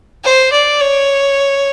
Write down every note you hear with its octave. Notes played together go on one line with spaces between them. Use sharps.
C5
D5
C#5